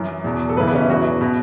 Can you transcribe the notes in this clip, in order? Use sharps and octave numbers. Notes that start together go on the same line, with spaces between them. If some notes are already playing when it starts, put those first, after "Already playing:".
Already playing: F#2 E3
E2 B2
A4
F#2 C#3 E3 B4
B3
C#4
E4
E2 B2 F#4
B2